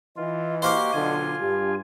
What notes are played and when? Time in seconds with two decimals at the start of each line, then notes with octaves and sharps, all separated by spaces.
0.17 E3 F4 D#5
0.62 A#3 F#4 G4 C5 F5 D6
0.93 B1 D3 F4 G#5
1.40 G2 G4